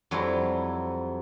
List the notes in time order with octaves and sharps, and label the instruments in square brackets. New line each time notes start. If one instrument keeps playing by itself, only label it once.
[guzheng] F2 F#3 G3 E4